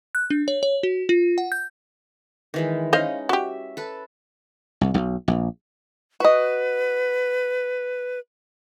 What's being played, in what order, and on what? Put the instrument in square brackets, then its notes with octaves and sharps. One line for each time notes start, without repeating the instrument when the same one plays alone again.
[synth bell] F#6
D4
C#5
C#5
F#4
F4
F#5
G6
[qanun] D#3 E3 G#3
[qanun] C#4 D#4 [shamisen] C5 D#5 F5
[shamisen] F#4 G4 [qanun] E5
[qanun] A4 B4
[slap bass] C2
B1
A#1
[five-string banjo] F#4 D#5 [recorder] B4